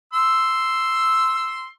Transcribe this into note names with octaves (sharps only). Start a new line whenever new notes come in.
C6 E6